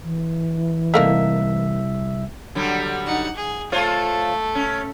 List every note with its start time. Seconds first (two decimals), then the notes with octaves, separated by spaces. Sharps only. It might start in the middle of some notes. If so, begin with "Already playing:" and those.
0.03 E3
0.94 C2 A3 A#3 D#4 E5
2.55 D3 F#3 G3
3.06 D#4 F#5
3.36 G#4
3.72 A3 F4 A4 C5 C#5
4.55 C#4